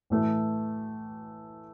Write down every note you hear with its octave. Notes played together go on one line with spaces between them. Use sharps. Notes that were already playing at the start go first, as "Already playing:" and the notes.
A2 E3 A3